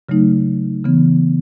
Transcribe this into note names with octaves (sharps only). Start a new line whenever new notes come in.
C#3 F#3 A3 D#4
C#3 E3 B3